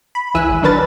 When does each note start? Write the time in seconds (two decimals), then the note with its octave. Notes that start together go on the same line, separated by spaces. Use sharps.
0.15 B5
0.34 C#2 E3 E4 G#5 E6 F#6
0.49 G#1
0.62 D#3 F#3 D4 A#4 B4 A6